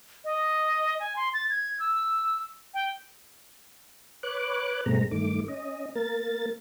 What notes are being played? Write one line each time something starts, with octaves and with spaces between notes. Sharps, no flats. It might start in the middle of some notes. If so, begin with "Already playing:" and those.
D#5
G#5
C6
A6
G#6
E6
G5
B4 C#5 D6 F#6
G2 B2 G#3 A3 C4 A#5
G2 D#3 A3 D6
C#4 D#5
A#3 A#4 A6